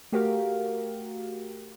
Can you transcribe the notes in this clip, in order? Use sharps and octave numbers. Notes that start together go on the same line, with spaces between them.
A3 F#4 G4 A#4 F5